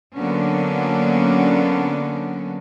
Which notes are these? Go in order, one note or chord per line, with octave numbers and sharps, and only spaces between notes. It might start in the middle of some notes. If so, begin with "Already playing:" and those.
D3 F#3 A#3 B3 C#4 D4